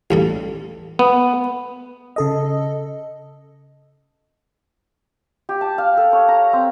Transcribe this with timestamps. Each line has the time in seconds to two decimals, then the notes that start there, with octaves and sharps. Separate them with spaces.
0.11 A1 G2 A4
0.99 B3
2.16 C#3 A4 D#5
5.49 G4
5.61 A5
5.78 F5
5.97 A4
6.13 C#5
6.28 A#5
6.53 C4